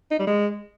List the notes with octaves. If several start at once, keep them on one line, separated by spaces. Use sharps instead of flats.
D#4
G3
G#3